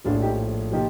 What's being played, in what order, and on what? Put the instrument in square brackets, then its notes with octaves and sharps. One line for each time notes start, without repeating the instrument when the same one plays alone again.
[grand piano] A#1 A2 F3 D4 F4
D#4 G4
A#2 F3 D#4 G4